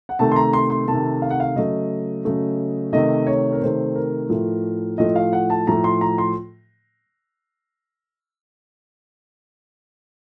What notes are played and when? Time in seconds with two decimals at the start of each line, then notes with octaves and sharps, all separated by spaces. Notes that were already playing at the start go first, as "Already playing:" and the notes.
0.09 F#5
0.19 C3 D#3 A3 A5
0.32 C6
0.36 A#5
0.53 C6
0.70 C6
0.87 C3 D#3 A3 A5
1.22 F5
1.31 F#5
1.40 F5
1.56 C#3 F#3 A3 D#5
2.25 C#3 F#3 A3
2.92 C3 D#3 A3 D#5
3.27 C#5
3.53 A#4
3.62 C3 D#3 A3 C5
3.96 A#4
4.30 A2 F3 A3
4.98 A2 F3 A3 D#5
5.16 F5
5.33 F#5
5.50 A5
5.67 A2 F3 A3 A#5
5.84 C6
6.01 A#5
6.18 C6